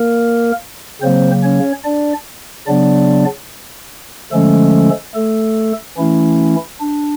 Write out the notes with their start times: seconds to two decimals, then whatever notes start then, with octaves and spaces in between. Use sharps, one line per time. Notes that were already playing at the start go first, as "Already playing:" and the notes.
Already playing: A#3 A#4
1.01 C#3 F#3 A#3 C4 C5
1.43 C#4 C#5
1.84 D4 D5
2.67 C#3 F#3 B3 D4 D5
4.32 D3 F3 G#3 A3 C#4 A4
5.15 A3 A4
5.97 E3 A3 C#4 E4
6.80 D4